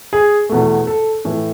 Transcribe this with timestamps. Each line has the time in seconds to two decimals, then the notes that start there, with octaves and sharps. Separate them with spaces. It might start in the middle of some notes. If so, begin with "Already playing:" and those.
0.13 G#4
0.49 E2 B2 A3
0.87 A4
1.25 A2 E3 A3